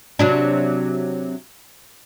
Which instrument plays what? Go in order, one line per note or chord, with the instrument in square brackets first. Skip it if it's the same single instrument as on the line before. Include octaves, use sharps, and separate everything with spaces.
[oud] C3 F#3 D4